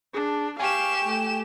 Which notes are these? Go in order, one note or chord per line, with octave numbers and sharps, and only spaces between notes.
D4 G#4 A5
G4 F5 G#5 C#6 E7
A3